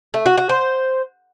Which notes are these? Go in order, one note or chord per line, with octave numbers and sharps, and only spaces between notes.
A3
F#4
F#4
C5